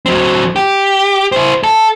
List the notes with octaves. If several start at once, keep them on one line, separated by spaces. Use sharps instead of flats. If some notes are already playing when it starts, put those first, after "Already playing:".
F#3 C4
G4
E4 C5
A4